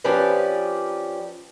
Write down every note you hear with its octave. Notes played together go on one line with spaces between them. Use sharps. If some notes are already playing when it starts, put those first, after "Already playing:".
F3 C#4 D4 G4 B4 D5